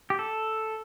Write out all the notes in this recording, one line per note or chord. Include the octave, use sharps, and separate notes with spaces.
G4
A4